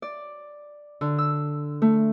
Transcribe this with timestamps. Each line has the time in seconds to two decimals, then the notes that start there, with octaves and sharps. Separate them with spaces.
0.02 D5
1.01 D3
1.18 E6
1.82 A3